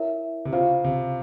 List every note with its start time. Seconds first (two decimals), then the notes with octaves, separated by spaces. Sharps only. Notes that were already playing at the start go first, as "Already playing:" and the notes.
Already playing: E4 A#4 C#5 E5
0.45 C3
0.53 C#3 F4 C5 F5
0.84 C3